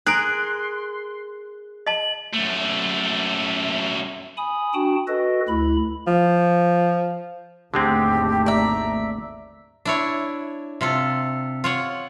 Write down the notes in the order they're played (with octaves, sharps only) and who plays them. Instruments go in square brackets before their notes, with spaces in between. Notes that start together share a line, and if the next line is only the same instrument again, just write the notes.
[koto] G#4 A#4 [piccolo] C6 [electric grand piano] F#6 D7
[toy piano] D#5 A5 [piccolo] F#7
[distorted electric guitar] F#2 A3
[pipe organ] G#5 B5 D#6
D4 F#4 G5 A5
F#4 A4 B4 D#5
D2 E4 B5
[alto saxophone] F3
[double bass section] G#1 D#2 A3 [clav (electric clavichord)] D3 G#3 C4 [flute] G4
[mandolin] D5 E5 [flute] A#5
[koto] D4 E4 C#5
C3 F4 A4
F4 C#5 F#5